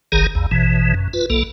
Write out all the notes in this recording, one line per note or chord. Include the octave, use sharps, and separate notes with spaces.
F#1 B1 D#3 G#4 A#5
A#1 E2
A1 B2 E3
F#2
F4 B4
B1 A#3 A4